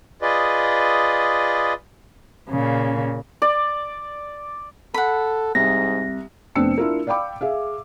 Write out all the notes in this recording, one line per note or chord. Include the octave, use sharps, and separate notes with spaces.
F4 G#4 B4 D5 D#5
A#2 C#3
D5
A4 F#5 B5
C2 G#2 A#6
F1 B3 C4 D4 E6 C#7
D4 E4 F4 A#4
D5 F5 G5 B5 D6
G#4 E5 F5